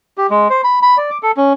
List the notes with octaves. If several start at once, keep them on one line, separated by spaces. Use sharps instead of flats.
G4
G#3
C5
B5
B5
D5
D6
A4
C#4